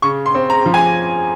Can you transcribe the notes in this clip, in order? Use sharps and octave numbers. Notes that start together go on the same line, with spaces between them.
C#3 C#6
C6
C4
A#5
F3
G#5